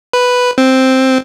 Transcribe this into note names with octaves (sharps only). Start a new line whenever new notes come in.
B4
C4